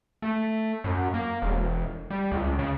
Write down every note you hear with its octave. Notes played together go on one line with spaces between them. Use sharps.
A3
F#2
A#3
E1
G3
C#2
C#3